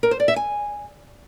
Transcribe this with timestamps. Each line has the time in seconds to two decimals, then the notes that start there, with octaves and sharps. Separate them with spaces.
0.03 A#4
0.11 C5
0.20 D5
0.28 E5
0.36 G#5